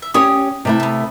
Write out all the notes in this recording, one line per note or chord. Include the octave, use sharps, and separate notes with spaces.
E5
C#4 G4 C#5 D#6
C3 A3 E4
B3 C4